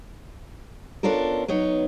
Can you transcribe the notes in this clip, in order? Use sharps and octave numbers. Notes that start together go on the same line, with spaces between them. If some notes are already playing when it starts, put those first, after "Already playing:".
B3 C#4 D4 F4 A4 A#4
F#3 B3 D#4 C#5